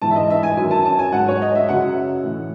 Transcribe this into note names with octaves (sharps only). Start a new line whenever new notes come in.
G#2 E3 A5
E5
D#5
E5
G#5
F#2 D#3 F#3 G#5
A5
A5
G#5
G#2 F#3 F#5
C#5
D#5
E5
F#2 C#3 F#3 F#5
A2 E3